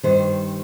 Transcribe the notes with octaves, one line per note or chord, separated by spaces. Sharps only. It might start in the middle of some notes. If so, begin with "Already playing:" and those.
G2 D#3 C5